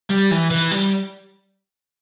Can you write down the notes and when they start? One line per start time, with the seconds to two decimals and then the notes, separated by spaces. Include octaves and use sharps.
0.11 G3
0.31 E3
0.51 E3
0.71 G3